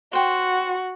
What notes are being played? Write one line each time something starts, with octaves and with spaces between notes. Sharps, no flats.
F#4 C5 G5